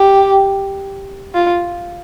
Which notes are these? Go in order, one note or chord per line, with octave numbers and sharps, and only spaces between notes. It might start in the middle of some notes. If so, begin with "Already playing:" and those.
Already playing: G4
F4